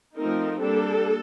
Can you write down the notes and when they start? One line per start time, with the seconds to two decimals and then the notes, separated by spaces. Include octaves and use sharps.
0.17 F3 A3 C4 D#4 A#4
0.61 G3 A#3 D4 A4